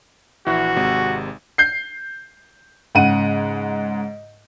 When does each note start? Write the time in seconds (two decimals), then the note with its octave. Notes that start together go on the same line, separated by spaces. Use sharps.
0.46 A#1 E3 E4 F#4
0.76 G#1 C3 G#3
1.58 G6 C7
2.95 G#2 C#3 F#5 D#7